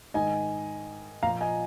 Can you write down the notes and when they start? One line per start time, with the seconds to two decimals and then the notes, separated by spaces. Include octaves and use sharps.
0.14 G#2 D#3 D#5 G#5
1.23 A#2 F3 F5 A#5
1.41 D#5 G#5